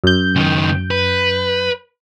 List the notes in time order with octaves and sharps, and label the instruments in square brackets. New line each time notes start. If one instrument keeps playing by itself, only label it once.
[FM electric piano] F#2 G6
[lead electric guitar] C#2 D#3
B4